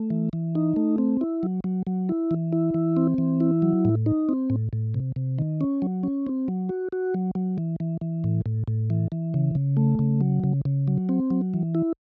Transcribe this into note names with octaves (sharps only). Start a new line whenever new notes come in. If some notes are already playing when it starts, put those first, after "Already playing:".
Already playing: A3
E3
E3
D#4
A3
C4
E4
F#3
F#3
F#3
E4
E3
E4
E3
C4
E3
E4
F#3
A2
D#4
C4
A2
A2
C3
C3
D#3
C#4
F#3
C#4
C4
F#3
F#4
F#4
F#3
F#3
E3
E3
E3
A2
A2
A2
E3
E3
C#3
C#3
A3
C#3
F#3
C#3
C#3
F#3
C4
F#3
E3
E4